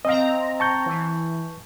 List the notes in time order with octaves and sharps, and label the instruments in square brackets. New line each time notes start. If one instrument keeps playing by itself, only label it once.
[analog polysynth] C4 A#5 [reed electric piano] D#5 F5
[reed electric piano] A5 C#6 G6
[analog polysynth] E3